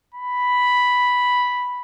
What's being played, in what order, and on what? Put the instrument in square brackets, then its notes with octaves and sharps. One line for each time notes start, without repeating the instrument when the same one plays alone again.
[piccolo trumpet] B5